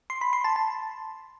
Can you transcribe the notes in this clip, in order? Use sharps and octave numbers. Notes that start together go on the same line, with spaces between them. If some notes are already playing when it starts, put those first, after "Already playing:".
C6
B5
C6
A5
A5